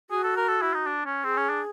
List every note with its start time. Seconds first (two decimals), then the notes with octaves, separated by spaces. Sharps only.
0.10 F#4 G#4
0.23 A4
0.37 A#4
0.48 A4
0.61 E4
0.74 D#4
0.86 D4
1.05 C#4
1.24 C4 G#4
1.37 C#4
1.50 D4